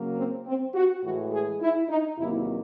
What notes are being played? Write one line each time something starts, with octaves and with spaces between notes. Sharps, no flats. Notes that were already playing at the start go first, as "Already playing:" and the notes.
Already playing: C#3 F#3 A#3
C4
C4
F#4
A2 E3 G#3 F#4
G#4
E4
D#4
E2 C3 D#3 F#3 A#3 E4